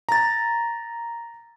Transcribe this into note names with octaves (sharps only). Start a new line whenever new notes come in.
A#5 A6